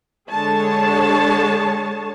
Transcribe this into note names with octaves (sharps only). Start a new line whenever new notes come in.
D3 G#3 G#4 C#5 A5